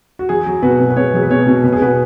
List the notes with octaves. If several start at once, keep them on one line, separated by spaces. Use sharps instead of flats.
F#4
F#3 G#4
F#3
B2 F#4 B4
B2
B4
B2 G#4 C#5
F#3 G#4
B4
B2 G#4 C#5
B2
B2 B4
G#4
B2 F#4 B4